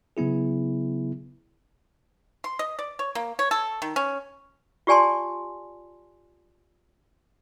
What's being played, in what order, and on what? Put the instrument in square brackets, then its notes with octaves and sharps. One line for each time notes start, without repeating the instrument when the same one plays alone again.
[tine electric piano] C#3 F#3 B3 E4 G#4
[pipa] C6
D#5
D5
C#5
A#3
C#5
A4
D#3
C#4
[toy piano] F4 G4 D5 G#5 A5 C6